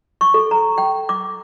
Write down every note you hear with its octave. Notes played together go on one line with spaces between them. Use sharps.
C#6
A4
A#5
G5
D6